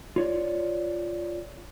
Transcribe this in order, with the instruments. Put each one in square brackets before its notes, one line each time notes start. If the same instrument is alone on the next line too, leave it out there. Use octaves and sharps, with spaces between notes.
[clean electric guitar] F4 C#5 D5